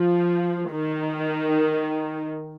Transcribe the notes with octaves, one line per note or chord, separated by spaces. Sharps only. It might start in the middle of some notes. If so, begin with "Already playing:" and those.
Already playing: F3
D#3